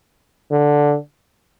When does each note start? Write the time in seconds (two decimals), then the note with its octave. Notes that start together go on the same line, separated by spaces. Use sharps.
0.52 D3